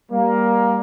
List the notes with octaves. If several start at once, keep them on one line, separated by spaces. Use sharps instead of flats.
G3 A#3